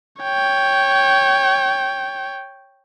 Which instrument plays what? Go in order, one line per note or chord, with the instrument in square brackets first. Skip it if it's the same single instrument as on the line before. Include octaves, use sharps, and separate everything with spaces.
[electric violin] C#5 G5